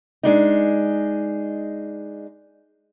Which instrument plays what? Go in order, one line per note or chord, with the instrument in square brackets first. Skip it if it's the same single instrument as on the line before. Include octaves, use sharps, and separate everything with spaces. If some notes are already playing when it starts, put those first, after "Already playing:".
[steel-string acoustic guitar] G#3 D4 D#4